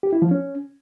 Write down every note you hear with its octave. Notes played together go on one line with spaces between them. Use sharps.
G4
E4
F3
C#4